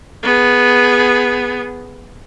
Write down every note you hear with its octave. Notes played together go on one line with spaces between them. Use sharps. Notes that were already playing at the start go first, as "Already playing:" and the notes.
B3 G#4